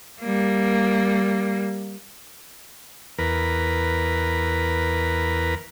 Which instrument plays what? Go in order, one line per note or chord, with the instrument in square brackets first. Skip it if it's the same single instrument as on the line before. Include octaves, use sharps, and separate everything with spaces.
[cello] G3 A#3
[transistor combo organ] E2 A#4 B4